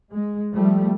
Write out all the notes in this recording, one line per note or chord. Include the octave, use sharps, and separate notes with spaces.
G#3
F3 G3 A3